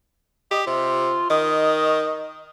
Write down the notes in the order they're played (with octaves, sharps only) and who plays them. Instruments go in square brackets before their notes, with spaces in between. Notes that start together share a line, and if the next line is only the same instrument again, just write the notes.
[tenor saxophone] G4 [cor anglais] D#5
[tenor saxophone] C3 [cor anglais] F4
[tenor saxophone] D#3 [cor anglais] D#5